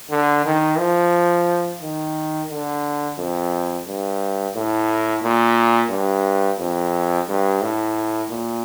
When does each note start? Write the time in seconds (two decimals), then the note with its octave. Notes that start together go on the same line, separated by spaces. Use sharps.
0.10 D3
0.45 D#3
0.79 F3
1.81 D#3
2.50 D3
3.18 F2
3.87 G2
4.55 A2
5.23 A#2
5.91 G2
6.59 F2
7.28 G2
7.62 A2
8.30 A#2